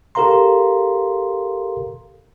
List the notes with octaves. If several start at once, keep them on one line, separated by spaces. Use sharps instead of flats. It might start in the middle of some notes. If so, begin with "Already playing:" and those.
G4 A4 A#4 F5 A#5 C6